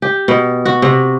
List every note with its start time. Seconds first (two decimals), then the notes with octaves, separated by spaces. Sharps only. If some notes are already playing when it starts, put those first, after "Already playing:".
0.02 G4
0.28 B2
0.65 F#4
0.82 C3